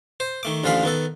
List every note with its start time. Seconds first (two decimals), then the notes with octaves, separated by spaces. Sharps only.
0.20 C5
0.43 D#3 A3 D6
0.64 A1 D3 F3 G#3 F5 B5
0.83 D#3 B3 A4